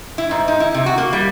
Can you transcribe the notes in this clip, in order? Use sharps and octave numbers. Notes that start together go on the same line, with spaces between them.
E4
G#2
D#4
E4
C3
F#4
A#3
G3